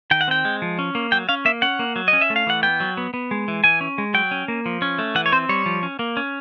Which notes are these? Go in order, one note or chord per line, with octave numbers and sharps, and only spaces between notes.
D#3 G5
F#5
C4 G5
G#3
F3
C#4
A#3
F#3 G5
C#4 F5
A#3 E5
C#4 F#5
A#3
F#3
D#5
C#4
E5
A3
F5
E3 F#5
B3 G5
F#3
B3
B3
G#3
E3
E3 G#5
C#4
G#3
F#3 G5
C#4
A#3
F3
C#4
A3
E3 F#5
C#5
C4 C5
G3 C#5
F3
C#4
A#3
C#4